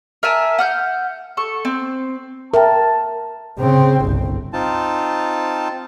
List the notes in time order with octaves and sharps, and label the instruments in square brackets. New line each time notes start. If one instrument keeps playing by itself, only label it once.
[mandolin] A#4 E5 G#5 A5
F#5 F6 G6
A4 C#6
C4
[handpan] A#4 [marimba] E5 G5 [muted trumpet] A5
[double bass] C#3 C4
G1 C2
[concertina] C4 D#4 F4 A5